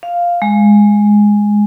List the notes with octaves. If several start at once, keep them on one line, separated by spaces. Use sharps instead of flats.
F5
G#3